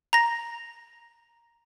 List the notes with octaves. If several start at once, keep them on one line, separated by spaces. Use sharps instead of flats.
A#5 A#6